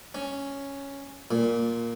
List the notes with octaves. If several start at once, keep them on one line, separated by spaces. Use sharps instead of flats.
C#4
A#2